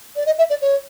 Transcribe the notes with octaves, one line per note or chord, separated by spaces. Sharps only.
D5
D#5
E5
D5
C#5